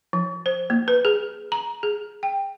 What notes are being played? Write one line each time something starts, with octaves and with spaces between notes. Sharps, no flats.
F3
C5
A#3
B4
G#4
A#5
G#4
G5